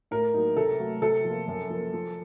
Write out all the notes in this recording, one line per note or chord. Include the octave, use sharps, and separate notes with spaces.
A2 A#4
F#3 A#3 D#4
C3 A4
F#3 A3
C3 A4
F3 A#3 F4
F#2
F3 A#3
F3